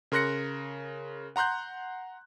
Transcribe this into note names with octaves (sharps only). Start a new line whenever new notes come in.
C#3 A#4 C6 F#6 A#6 C#7
F#5 A#5 C6 F#6 G6